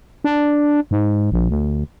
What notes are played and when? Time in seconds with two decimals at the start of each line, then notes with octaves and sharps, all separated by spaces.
0.24 D4
0.91 G#2
1.32 A#1
1.50 D2